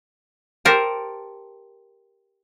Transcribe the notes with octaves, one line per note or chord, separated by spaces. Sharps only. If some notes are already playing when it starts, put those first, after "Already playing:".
G4 A4 A#4 C5